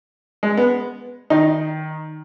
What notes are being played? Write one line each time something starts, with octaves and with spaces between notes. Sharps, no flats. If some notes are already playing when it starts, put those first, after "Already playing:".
G#3
B3
D#3 D#4